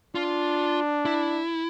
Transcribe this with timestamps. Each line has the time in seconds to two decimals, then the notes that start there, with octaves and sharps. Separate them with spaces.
0.15 D4 F4
1.05 E4